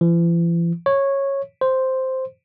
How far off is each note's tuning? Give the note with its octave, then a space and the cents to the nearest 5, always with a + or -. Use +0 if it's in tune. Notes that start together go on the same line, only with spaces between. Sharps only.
E3 +45
C#5 -10
C5 +0